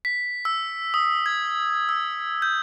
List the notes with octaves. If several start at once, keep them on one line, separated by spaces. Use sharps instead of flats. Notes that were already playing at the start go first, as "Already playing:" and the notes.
B6
E6
D#6
G#6
E6
G6